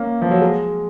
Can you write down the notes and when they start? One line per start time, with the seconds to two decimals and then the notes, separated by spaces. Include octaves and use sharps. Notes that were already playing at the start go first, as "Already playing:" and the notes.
Already playing: A#3 C#4
0.22 F3
0.31 F#3
0.41 G#3